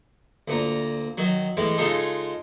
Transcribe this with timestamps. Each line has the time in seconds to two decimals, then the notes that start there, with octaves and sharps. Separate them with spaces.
0.48 D2 A#2 A#5
1.18 D#3 F#3
1.57 A2 E3 G#3
1.78 C#3 G#3 D#4 F4 G#4 A4